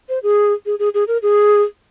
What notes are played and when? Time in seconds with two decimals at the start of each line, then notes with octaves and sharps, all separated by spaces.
0.09 C5
0.23 G#4
0.66 G#4
0.79 G#4
0.94 G#4
1.08 A#4
1.22 G#4